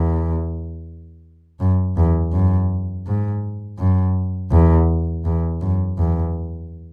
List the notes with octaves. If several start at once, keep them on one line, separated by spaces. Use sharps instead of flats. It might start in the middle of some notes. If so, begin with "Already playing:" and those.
Already playing: E2
F#2
E2
F#2
G#2
F#2
E2
E2
F#2
E2